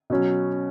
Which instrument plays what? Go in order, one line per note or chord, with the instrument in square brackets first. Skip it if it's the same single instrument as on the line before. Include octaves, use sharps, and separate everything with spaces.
[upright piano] B2 F#3 C#4